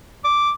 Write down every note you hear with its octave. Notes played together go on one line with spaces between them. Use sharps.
D6